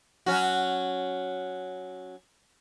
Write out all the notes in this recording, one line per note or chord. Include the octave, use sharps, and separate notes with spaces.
F#3 C#4 F#4